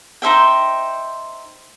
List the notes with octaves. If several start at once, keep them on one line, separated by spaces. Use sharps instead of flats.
D#4 C5 E5 G5